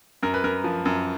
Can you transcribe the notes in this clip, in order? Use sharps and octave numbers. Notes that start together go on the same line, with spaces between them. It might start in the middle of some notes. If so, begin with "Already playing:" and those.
F#2 A#4
B4
F#2 A#4
F3
F#2